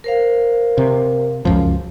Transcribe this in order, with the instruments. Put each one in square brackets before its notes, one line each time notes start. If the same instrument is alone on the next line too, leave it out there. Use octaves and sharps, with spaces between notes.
[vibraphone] A#4 C5 F5
[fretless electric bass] C3
C#2 F#2 F3